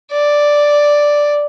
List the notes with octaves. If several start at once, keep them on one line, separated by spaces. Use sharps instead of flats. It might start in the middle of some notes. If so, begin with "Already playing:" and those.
D5